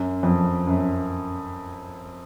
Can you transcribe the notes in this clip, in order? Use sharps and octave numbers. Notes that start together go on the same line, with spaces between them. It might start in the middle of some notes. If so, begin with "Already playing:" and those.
Already playing: F#2
F2
F#2